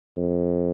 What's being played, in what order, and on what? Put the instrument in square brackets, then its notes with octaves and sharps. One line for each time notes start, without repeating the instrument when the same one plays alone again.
[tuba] F2